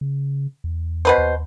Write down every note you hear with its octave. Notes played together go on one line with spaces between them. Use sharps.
C#3
E2
B2 B4 C5
D#2